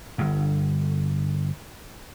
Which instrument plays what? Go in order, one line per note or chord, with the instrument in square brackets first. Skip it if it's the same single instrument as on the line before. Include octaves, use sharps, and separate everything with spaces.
[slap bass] G1 G2